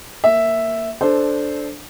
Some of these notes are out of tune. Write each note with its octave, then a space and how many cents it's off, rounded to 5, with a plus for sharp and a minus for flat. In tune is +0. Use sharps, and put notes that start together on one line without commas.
A#3 -10 E5 +0
D4 +0 A4 -15 C5 -5